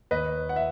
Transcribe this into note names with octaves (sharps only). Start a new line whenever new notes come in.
D#2 B4 D#5
F#5
E5